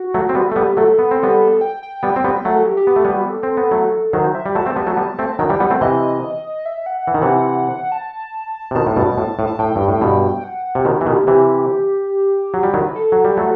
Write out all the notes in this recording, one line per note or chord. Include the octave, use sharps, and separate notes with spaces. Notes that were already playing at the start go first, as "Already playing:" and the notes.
Already playing: F#4
F#3 A3
C4
G3 B3
A3 A4
G3 B3
G4
F#3 A3 A4
B3
C4
G3 B3
G5
G5
G3 B3
C4
G3 B3
F#3 A3 F#5
A4
G4
G4
B3
A3
G3 B3
F#4
G4
A4
C4
B3
F#3 A3
D#3 F#3 C5
C5
E5
G3
F#3 A3 A5
A3 C4
G3 B3
F#3 A3
G3 B3
A3 C4
D#3 F#3 G5
E3 G3
G3 B3 F#5
A3 C4
C3 E3 D#5
E5
F#5
E3
D#3
C3 E3
A5
C3
B2 D#3 A5
A2
G2 B2
B2
A2
A2
A5
A2 G5
G2
A2
G2 B2
F#5
C3
B2 D#3 G4
E3
B2 D#3 G4
C3 E3 G4
F#3
G3
D#3 F#3
B4
A4
F#3
G3
F#3 A3